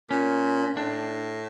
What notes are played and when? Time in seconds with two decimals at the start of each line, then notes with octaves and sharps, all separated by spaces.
0.10 A#2 C#4
0.76 A2 D4